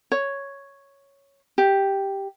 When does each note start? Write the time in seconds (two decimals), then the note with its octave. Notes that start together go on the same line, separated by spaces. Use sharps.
0.12 C#5
1.58 G4